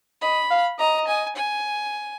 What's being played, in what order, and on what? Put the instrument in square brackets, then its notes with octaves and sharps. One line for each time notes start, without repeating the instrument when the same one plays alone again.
[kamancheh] D#5 [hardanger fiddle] B5
[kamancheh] F5
[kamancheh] D#5 [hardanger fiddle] A#5
[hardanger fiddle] G#5
G#5